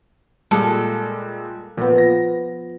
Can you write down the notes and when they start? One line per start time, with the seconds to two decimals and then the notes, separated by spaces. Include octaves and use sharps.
0.51 A#2 G3 G#3 A4
1.77 A#2 F3 B3
1.98 A#6